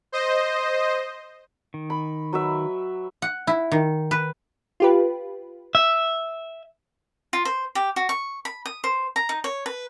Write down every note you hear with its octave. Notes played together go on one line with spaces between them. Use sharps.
C5 D#5
D#3
B5
F#3 B4 E5
F#5
E4
D#3
B4
F4 G4 B4
E5
F4
C5
G4
F#4
C#6
B5
D#6
C5
A#5
D#4
C#5
B4